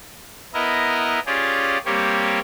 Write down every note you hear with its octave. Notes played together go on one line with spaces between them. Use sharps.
B3 E4 A#4 D#5
C#4 F4 G4 G#4 D5
G3 A#3 C4 G4 C#5